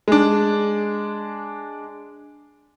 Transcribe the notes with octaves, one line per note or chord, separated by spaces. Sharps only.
G#3 D4